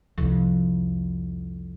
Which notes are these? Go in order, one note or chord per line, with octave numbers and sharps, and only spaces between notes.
C2 F2